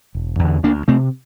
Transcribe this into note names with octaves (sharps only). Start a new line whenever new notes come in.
E1
E2
D3
D2 A#3 D4
C3 A3 C4